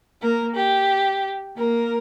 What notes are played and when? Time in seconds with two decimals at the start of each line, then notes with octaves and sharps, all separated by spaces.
0.21 A#3 A#4
0.55 G4
1.57 A#3 A#4